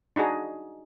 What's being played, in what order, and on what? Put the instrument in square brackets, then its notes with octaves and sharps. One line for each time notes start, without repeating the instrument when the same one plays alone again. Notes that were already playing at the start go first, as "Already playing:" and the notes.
[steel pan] D4 D#4 F#4 G#4